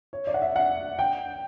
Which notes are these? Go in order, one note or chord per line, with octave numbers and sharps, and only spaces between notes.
C#5
D5
F#5
E5
F#5
G5